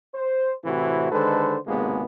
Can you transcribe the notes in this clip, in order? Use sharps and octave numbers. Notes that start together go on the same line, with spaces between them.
C5
A2 C3 E3 C4 E4 F#4
D3 D#3 G#3 A4 B4 C5
G#1 C#2 C3 G#3 A#3 B3